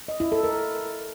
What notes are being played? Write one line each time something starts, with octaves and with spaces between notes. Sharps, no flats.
D#5
E4
A4
A#4